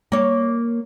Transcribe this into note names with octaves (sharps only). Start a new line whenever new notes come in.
A#3 C#5